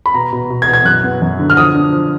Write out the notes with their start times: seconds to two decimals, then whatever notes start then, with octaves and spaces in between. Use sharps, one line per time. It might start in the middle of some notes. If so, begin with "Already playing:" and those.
0.06 B5
0.14 B2 A#5
0.33 B2
0.50 B2
0.62 G#6
0.68 B2
0.73 G#6
0.85 F#2 F#6
1.04 B3
1.22 F#2
1.39 D3
1.50 F6
1.57 F3 D#6
1.75 D4
1.92 F3